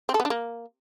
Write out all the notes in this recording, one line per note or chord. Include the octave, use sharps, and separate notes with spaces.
C4
A4
B3
D4
A#3